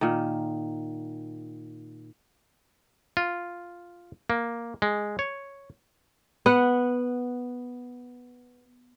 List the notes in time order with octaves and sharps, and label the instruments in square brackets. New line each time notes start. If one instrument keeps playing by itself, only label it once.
[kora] A#2 D#3
[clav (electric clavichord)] F4
A#3
G#3
C#5
[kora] B3 F#5